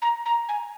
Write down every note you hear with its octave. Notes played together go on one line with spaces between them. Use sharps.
A#5
A#5
G#5